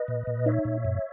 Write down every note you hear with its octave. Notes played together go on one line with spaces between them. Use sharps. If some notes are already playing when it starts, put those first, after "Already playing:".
Already playing: B4 D#5
A#2
A#2
D#4 C#5 E5
A#2
F#2